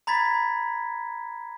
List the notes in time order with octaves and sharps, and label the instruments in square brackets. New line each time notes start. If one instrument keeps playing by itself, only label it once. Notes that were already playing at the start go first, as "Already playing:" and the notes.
[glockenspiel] A#5 B5 G#6 A6 B6